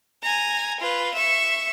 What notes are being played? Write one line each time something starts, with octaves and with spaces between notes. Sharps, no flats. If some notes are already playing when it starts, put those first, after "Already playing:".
G#5 A#5
F4 B4
E5 C#6